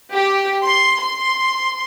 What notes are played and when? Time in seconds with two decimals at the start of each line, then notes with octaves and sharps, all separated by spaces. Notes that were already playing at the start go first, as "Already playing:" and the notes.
0.10 G4
0.64 C6
0.98 C6